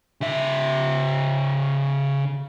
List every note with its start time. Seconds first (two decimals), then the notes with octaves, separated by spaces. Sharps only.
0.21 C#3 E5